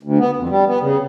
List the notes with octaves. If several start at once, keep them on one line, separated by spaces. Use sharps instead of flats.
D2
B3
F2
G3
B3
C#3